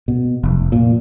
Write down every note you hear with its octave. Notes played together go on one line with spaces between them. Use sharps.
B2
F1
A#2